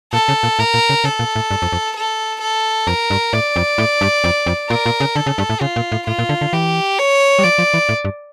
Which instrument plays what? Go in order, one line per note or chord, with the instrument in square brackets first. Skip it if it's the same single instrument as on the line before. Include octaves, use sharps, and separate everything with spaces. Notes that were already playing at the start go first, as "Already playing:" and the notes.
[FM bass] A#2 [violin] A4
[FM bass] C#3
A#2
[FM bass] A2 [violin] A#4
[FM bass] A#2
C#3
[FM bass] C#3 [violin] A4
[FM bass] A#2
A2
G2
F2
F2
[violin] A4
A4
[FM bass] F2 [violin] A#4
[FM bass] G2
[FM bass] A2 [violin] D5
[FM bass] F2
A2
G2
F2
F2
[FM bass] A#2 [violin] A#4
[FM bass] A#2
C#3
[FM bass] D3 [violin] A4
[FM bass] C#3
G2
A2
[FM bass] C#3 [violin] F4
[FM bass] A#2
A2
[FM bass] A2 [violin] F4
[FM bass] A#2
D3
D3
[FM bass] E3 [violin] G4
[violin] C#5
[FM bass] G3
[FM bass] F3 [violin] D5
[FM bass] F3
E3
A2
G2